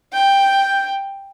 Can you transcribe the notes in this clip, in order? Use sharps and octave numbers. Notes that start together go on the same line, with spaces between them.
G5 G6